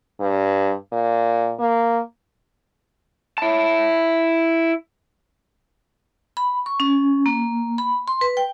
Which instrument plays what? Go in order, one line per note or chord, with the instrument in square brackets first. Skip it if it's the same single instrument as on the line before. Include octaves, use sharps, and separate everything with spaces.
[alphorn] G2
A#2
A#3
[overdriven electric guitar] E4 A5
[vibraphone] B5
C#6
C#4
A#3
B5
C6
B4
G5